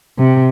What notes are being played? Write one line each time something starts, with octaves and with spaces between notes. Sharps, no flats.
C3